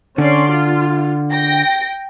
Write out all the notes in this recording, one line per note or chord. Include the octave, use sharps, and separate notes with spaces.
D3 C#4 D5 C6
F4
G5 A#6